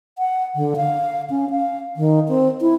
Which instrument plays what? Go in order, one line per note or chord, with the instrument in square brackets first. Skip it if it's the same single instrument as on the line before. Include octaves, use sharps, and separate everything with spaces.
[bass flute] F#5
D3
F5
C#4
F5
D#3
C4
E4